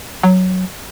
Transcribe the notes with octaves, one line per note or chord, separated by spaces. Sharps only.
F#3